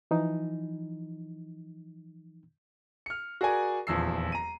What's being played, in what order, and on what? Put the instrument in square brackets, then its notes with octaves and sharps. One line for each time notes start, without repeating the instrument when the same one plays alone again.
[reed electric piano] E3 F3 D#4
[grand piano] F6 C#7
F#4 G#4 A#4 D5 G#5
D#1 E2 F3 E6 C7
A#5 D#7